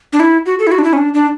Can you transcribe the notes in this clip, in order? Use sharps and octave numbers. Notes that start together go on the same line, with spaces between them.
D4
E4
F#4
A4
E4
F#4
D4
E4
C#4
D4
D4